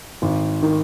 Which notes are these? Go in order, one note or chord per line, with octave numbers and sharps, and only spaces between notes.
G#1
D#3